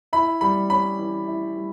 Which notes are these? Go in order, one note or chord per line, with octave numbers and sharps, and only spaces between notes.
E4 B5
G3 B5
C#4 B5
E3
E4
G3